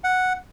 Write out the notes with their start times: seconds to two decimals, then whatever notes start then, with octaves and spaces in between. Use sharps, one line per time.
0.04 F#5